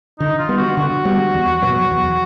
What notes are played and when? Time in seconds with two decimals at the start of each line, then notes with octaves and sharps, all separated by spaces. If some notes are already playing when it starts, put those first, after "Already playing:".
0.20 D3 D#4
0.38 F4
0.49 G3 B3
0.58 F#4
0.77 D3 F#4
1.05 G3 B3
1.34 E2
1.62 B2 F#3 B3
1.91 E2